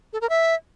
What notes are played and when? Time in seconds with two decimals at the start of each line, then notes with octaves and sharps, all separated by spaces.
0.13 A4
0.21 A#4
0.29 E5